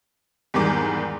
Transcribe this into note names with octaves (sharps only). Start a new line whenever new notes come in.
E2 G#2 D#3 G3 D6